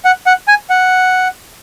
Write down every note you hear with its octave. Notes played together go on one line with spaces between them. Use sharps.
F#5
F#5
G#5
F#5